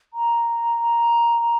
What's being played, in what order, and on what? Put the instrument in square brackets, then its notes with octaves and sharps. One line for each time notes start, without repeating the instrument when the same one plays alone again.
[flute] A#5